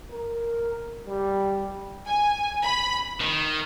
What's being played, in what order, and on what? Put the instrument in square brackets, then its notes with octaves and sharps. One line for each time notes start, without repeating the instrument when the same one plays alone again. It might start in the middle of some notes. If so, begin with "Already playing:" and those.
[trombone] A#4
G3
[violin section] G#5
B5
[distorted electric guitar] D#3